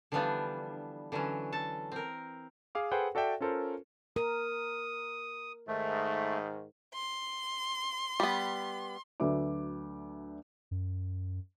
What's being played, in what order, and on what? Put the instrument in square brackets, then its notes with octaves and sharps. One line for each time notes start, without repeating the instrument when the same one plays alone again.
[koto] D3 E3 F3 G3 B3 D4
D3 E3 F#3 C#4
A4 A5
C4 A#4
[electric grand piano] G#4 F5 D6
G#4 A4 B4 C5 F#5 G5
F#4 A4 D5 E5 G5
C#4 F4 A4 A#4 C5
[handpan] A#4 [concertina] D#6
[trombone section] G#2 D#3 [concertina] A3
[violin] C6
[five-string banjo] G3 B3
[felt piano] D2 D3 F#3 B4 E5 D6
[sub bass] F#2